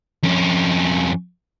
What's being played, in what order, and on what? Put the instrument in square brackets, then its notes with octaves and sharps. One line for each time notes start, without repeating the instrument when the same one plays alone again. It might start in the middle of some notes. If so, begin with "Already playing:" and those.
[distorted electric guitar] F2 C#4